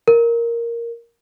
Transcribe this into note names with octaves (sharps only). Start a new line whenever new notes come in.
A#4